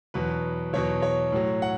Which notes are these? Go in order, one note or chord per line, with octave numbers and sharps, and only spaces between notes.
E2 B2 F#3 B4
E2 B2 F#3 C#5
C#5
A2 F#3
F#5